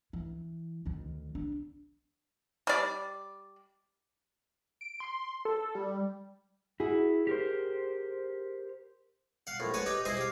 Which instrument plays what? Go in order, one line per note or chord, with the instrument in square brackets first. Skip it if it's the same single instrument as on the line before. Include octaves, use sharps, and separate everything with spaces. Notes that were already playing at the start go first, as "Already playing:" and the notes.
[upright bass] E3
D2 D#3
D4
[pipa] G3 D5
[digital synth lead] D7
C6
A4
G3
[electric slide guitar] E4 [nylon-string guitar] F#4 G#4
[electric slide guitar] G4 A#4 C5
[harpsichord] F5 F#5
A#1 A2
B4 C#5 F#5 G#5 A5
D#4 G4 B4 G5
E4 G#4 C5 D#5
G4 F5